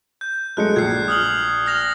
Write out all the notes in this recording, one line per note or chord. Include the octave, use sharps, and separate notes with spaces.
G6
F#3 G#3 A3 F#6 C#7
A#1 G#6 C7
D#6 F6 F#7
F6 A#6 F7